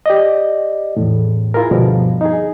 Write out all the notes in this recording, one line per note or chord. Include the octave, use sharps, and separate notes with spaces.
G4 D5 D#5
E2 A2
E4 F4 G#4 A#4
D2 G2 B2 D3 F3 G3
D#4 G#4